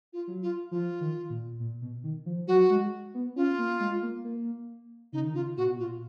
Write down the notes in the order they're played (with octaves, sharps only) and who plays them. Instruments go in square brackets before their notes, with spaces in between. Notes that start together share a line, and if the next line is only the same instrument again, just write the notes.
[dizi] F4
[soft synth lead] F#3
[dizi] F4
[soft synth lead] F3 [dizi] F4
[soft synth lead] D#3
A#2
A#2
B2
D#3
F3
[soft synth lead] F#3 [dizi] F#4
[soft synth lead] G#3
B3
[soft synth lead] C#4 [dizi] F4
[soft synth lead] A#3
G#3
A#3
A#3
[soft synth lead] C#3 [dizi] D#4
[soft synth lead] D#3
[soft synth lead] C#3 [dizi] F4
[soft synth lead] A#2 [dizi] F#4
[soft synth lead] B2
[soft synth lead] A#2 [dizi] F4